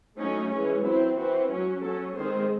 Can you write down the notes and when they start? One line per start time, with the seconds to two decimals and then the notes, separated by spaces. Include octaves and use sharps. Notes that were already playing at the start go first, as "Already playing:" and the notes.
0.17 F#3 A3 C#4 D#4
0.50 E3 G#3 C#4
0.82 F#3 C4 E4
1.15 E3 C4 F#4
1.47 F#3 C#4
1.81 F#3 C#4 A4
2.13 D#3 G#3 C4 C5